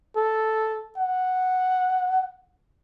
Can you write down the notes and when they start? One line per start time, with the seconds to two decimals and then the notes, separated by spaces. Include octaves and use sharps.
0.16 A4
0.98 F#5